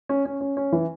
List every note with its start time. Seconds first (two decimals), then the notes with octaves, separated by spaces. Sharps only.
0.09 C#4
0.26 C#4
0.41 C#4
0.57 C#4
0.72 E3